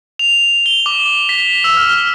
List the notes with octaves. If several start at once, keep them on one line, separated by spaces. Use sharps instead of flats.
F7
G7
D6
B6
E6
F6